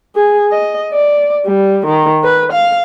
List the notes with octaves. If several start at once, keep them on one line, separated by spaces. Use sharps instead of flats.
G#4
D#5
D5
G3
D#3
B4
F5